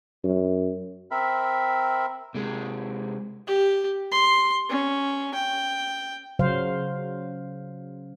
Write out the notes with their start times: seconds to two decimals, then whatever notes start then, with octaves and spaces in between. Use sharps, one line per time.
0.24 F#2
1.11 C4 A#4 E5 B5
2.35 C3 G#3
3.47 G4
4.12 C6
4.69 C#4
5.34 G5
6.39 C#3 F#3 C5 F5